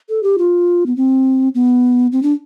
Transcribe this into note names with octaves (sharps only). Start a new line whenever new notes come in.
A4
G4
F4
B3
C4
B3
C4
D4